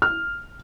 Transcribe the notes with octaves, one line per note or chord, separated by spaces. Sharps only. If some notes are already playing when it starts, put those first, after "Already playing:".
F6